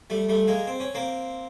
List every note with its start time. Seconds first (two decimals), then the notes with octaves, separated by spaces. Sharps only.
0.10 G3 A3
0.29 G3 A3
0.47 G#3 A#3
0.67 C4
0.80 C#4
0.95 A#3 C4